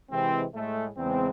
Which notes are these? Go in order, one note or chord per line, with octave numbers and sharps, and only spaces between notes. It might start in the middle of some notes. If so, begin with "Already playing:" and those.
C3 E3 G#3 C4
A2 G#3 A3
E2 C#3 G#3 C4